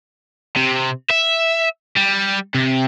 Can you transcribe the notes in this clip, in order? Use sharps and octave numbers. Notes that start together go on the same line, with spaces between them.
C3
E5
G3
C3